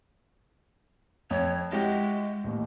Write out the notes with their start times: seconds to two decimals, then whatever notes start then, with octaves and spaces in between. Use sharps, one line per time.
1.31 F2 C#5
1.72 G#3 E4 F#4 G4
2.44 A1 D#2